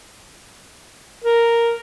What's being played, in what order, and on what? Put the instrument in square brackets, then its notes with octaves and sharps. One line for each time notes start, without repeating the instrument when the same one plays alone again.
[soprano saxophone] A#4